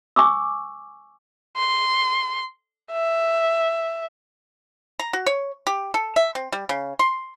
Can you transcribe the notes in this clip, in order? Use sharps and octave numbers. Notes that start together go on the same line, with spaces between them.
G#5 C#6 D6 E6
C6
E5
A#5
F#4
C#5
G4
A4
E5
C4
G3
C#3
C6